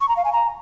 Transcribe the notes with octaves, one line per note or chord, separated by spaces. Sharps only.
C#6
A#5
F5
G#5
A#5